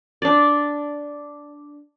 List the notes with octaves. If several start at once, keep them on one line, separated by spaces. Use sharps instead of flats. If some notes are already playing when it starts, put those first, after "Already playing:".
D4 D5